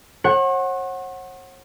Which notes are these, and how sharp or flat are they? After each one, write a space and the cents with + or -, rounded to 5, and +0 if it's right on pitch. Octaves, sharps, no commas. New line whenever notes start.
C#5 -45 F#5 +0